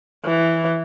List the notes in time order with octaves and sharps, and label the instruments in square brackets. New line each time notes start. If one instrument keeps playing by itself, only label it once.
[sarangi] E3